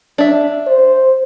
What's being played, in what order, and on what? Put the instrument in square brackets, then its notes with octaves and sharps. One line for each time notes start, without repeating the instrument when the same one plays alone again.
[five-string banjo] D4 E5
[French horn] C5